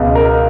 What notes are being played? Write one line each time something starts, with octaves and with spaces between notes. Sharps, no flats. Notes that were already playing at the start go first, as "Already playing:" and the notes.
Already playing: C#2 B2
A#4